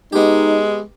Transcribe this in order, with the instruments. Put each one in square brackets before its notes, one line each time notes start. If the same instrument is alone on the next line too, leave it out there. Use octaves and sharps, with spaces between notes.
[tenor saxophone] G#3 [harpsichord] B3 G4 [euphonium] D#4